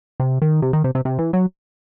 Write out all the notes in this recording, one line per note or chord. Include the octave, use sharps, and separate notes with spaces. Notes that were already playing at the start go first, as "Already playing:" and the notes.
C3
D#3
C3
D#3
C3
C3
C3
E3
F#3